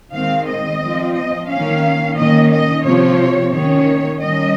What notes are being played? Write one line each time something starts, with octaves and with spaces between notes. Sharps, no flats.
D#3 G#3 C4 F5
D#5
F3 C4
D#5
D#3 A#3 C#4 F5
D#3 A#3 C#4 D#5
D#5
C3 F3 C4 C#5
D#3 A#3 C#4 C#5
D#3 G3 C#4 D#5